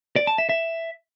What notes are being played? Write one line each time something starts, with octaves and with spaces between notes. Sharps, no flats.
D5
A5
E5
E5